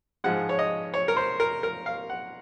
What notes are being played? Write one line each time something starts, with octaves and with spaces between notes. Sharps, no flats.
G#2 F3 G#3 F#5
C#5
D#5
C#5
A#4
C5
A#4
A#4
F5
F#5